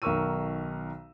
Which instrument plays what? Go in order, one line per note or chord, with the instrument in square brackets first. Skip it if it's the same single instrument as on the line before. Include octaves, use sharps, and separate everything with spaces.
[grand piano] B1 D#3 A#4 C#6 E6 D#7